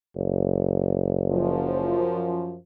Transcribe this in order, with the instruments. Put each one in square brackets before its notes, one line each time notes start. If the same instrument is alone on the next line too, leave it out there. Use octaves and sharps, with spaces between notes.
[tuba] F#1
[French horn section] F#2 F3